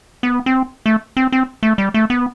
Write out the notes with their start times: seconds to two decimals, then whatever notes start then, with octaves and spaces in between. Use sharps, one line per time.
0.23 B3
0.46 C4
0.86 A3
1.17 C4
1.32 C4
1.63 A3
1.78 G3
1.94 A3
2.10 B3